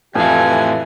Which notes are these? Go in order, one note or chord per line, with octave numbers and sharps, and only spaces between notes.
F2 A2 E3 G4 F5 G#5